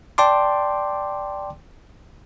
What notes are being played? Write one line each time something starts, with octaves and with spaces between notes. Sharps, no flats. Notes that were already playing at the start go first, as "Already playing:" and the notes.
D5 G5 A5 C6 D6